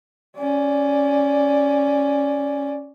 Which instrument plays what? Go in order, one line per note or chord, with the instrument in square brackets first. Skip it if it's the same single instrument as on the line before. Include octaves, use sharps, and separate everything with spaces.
[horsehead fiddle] C#4 D5